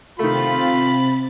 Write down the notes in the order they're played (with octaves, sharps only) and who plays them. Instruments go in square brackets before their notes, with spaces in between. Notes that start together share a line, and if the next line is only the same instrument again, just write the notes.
[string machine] C3 C4 A6 [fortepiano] D#3 A3 [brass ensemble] F4 [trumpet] B5